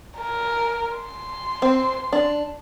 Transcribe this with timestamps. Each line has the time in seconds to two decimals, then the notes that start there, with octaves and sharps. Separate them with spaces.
0.19 A#4
0.97 C6
1.62 C4
2.13 D4